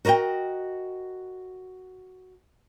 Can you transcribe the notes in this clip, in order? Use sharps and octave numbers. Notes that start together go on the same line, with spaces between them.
F#4 A#4 C#5 D#5 G5